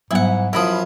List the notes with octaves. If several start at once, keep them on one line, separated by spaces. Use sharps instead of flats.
G#2 F#3 G3 B3 E4 F#5
F#2 F3 E4 B5 D#6